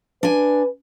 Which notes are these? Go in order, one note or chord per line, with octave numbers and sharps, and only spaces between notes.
D4 B4 G#5